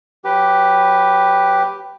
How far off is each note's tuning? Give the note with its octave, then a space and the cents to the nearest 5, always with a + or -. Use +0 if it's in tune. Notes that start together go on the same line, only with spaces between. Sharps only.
F#3 -25 G4 +0 B4 +0